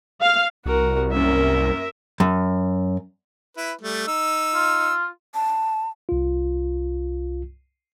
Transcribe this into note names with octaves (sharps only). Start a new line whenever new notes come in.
F5
C2 F#4 A#4
F#2 A#3 C#4 A#4 E5
F#2
E4 B4
G3 A3
D#4 E6
F4
A5
C2 F4